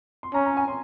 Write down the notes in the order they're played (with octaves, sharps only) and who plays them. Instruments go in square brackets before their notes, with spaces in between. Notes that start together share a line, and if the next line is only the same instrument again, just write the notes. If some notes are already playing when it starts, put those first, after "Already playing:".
[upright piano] C6
[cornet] C#4 [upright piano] A#5
[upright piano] A#5
G#5
C6